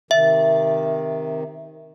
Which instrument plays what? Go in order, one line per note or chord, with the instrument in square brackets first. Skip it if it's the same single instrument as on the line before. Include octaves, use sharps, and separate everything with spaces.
[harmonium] C3 D#3 [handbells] E5